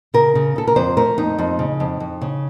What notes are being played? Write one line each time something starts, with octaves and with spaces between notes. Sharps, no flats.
C#3 A#4
C#3
C#3 A4
A#4
F2 C5
A3 A#4
F2 D#4
F2
C#3
F2
F2
C#3